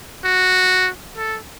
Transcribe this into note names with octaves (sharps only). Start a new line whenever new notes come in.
F#4
A4